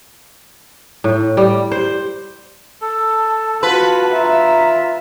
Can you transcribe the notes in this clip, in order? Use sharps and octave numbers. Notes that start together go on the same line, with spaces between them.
A2
G3
C5
A4 A5
F4 F#4 B4 A5
F4 E5 A#5